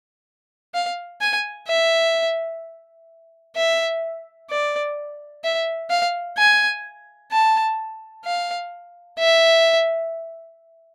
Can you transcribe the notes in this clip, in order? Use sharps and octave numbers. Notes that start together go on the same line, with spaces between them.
F5
G#5
E5
E5
D5
E5
F5
G#5
A5
F5
E5